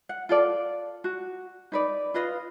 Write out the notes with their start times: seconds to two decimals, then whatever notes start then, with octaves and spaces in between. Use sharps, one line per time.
0.09 F#5
0.29 F4 A4 D5
1.04 F#4
1.72 D#4 B4 D5
2.14 F4 B4 D#5 F5